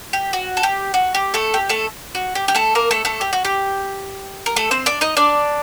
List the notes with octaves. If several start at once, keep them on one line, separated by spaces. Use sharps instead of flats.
G4
F#4
A4
G4
F#4
G4
A3 A4
G4
A3 A4
F#4
G4
G4
A3 A4
A#3 A#4
A3 A4
A3 A4
G4
F#4
G4
A#4
A3 A4
C4 C5
D4 D5
D#4 D#5
D4 D5